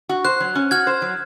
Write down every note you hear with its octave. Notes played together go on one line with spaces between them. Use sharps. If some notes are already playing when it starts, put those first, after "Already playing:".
F#4
C5 F#6
F#3
C#4
F#4 F6 G#6
C5
F#3